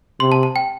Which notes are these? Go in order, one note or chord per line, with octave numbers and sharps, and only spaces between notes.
C3 C6
A5
A5
G5